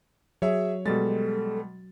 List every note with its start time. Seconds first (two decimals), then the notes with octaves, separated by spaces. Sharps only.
0.42 F#3 G#4 C#5 E5
0.86 B2 G3 G#3 A4 A6